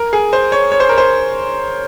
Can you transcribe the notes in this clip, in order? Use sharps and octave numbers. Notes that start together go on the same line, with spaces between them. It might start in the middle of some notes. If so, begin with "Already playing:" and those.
Already playing: A#4
G#4
C5
C#5
C#5
C5
A#4
C5